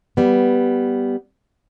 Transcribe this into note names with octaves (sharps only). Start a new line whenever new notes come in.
G3 B3